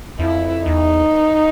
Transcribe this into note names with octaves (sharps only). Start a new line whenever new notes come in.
F2 E4
E2 D#4